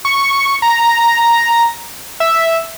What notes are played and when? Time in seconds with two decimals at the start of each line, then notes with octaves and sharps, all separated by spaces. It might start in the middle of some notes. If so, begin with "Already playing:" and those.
0.05 C#6
0.62 A#5
2.20 E5